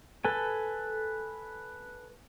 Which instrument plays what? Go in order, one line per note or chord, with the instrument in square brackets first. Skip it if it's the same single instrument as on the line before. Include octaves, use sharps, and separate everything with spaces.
[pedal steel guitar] A4 B4 G#5